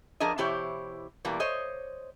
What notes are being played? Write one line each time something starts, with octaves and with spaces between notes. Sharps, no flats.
F3 D4 G#4 A#4 D#5
B2 E3 E4 G4 C5 C#5
B2 E3 G3 A#3
C5 C#5 D#5